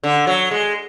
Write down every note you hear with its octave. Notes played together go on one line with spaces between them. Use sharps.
D3
F#3
G#3